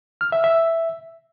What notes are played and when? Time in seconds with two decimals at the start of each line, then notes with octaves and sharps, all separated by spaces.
0.21 F6
0.32 E5
0.44 E5